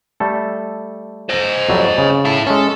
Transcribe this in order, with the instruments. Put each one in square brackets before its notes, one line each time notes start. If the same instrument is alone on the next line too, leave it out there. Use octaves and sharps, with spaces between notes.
[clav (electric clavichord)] G3 A3 A4
[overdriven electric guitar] C5 D#5
[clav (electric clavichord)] F2 F#3 G3
C#3
[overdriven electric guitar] E4 A4
[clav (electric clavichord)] G#3 C#4 [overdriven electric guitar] A4